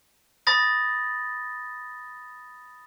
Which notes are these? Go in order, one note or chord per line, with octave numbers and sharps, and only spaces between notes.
B5 D#6 A6 A#6